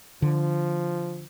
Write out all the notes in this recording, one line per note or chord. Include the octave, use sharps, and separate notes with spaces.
D3 F3